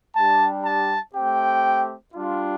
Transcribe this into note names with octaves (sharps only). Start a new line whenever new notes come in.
G3 D4 G4 A5
A5
A3 C4 G4 G5
G3 D4 F4